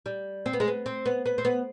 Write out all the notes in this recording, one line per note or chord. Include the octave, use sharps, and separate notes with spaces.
G3
C4
B3
G#3
B3
C4
B3
B3
C4
B3